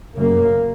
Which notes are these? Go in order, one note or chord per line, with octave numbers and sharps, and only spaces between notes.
F#2 C#3 A#3